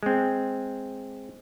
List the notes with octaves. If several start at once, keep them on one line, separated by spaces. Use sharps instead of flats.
G#3 C4